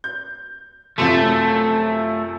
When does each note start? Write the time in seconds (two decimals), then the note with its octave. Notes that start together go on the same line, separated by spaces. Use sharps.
0.04 G6
0.98 F#2 C3 F3 A3